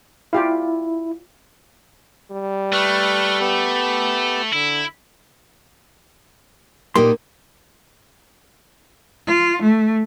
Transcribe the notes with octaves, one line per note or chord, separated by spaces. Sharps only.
E4 F4 G4 F5
G3
A3 B4 C#6 F6
B3 G4
D3 E4
A#2 A#3 B3 D#4 G4 C6
F4
A3